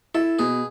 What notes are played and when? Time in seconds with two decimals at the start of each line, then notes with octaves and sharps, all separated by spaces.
0.14 E4 A4
0.39 B2 G#4